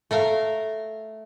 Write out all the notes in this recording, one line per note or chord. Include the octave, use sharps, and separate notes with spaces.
A3 A#4 F5